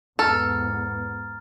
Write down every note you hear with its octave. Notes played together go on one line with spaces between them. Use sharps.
E2 G#2 B3 A4 A#5 F6 A6